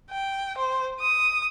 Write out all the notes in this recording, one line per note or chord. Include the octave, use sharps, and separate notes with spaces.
G5
C5
D#6